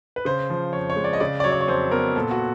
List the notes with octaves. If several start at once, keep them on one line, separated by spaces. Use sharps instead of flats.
B4
C#3 C5
F3
F2 C#5
C#5
G#3
D5
D#5
C#3 D5
D5
F#3 C#5
D5
C#5
F2 C5
B3 A#4
A#2 A4
F#4